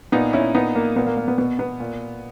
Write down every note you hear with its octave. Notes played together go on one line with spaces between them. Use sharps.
A#2 B3 D#4
C#4 E4
A#2 B3 D#4
A#3
A#2 B3
A#3
A#3
B3
B2 B3
B3
A#2